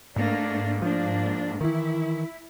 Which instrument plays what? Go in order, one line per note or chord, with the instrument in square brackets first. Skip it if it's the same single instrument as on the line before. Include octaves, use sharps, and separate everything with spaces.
[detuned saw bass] G#2 [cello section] A3 A#3 D4
[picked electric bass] F3 [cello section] A#3 D4
[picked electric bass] D#3 E3 [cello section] E4